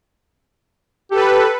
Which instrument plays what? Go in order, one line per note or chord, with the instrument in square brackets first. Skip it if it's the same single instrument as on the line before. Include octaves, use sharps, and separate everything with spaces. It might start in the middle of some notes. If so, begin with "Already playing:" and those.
[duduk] G4 [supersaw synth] A4 B4